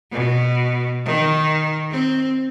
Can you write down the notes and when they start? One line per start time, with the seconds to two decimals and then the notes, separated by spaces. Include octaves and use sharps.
0.12 B2
1.06 D#3
1.91 C4